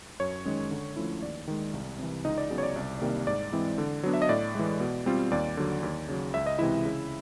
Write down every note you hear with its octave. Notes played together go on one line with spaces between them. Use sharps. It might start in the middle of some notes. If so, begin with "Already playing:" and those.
F#2 C#5
D#3 G#3 C#4
D3
F3 A3 C#4 E4
D#2 D5
D#3 G#3
C2
C3 E3
C#2 D#4 D#5
D5
C#3 F#3 B3
C#5
D5
C2
C3 D#3 G3 A#3
G#2 D5
E3 G#3 C4 E4
D3
F#3 B3 D4
E5
D#5
A2 D5
E3 G#3
B2
G3 C4 F4
D#2 D5
D3 F#3
D#2
C#3 F#3
C#2 E5
D#5
C3 E3 G#3 E4 E5
C#3